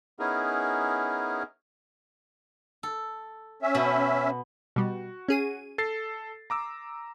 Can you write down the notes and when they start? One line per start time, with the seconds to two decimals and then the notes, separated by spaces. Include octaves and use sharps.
0.20 B3 C#4 D#4 E4 G#4 A#4
2.83 A4
3.62 C#4 E5
3.75 B2 F#4
4.76 B2 G3 F#4
5.28 C#4 G#4 D#7
5.78 A4 A6 C7
6.50 A#5 D6 E6